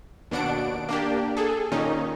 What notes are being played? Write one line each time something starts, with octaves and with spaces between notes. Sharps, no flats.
D#2 B2 D4 F#5 D7
A#3 D4 G4
G#4 A4
A#2 D#3 C#4 D#4